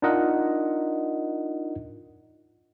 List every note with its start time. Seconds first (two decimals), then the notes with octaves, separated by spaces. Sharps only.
0.02 D4 D#4 F4 A#4 D#5 F#5